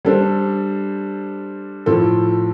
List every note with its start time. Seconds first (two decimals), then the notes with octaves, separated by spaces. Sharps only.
0.05 G3 D4 A4 C5
1.86 A2 F3 C4 F4 A4